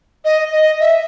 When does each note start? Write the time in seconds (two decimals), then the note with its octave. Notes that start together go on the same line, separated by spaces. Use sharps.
0.25 D#5
0.52 D#5
0.80 E5